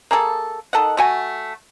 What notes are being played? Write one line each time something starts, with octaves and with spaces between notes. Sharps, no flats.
A#3 G#4 A4
D#3 A4 D#5 F#5
A3 F#4 G#5